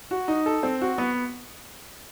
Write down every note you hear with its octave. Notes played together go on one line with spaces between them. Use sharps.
F#4
D#4
A4
C4
F#4
B3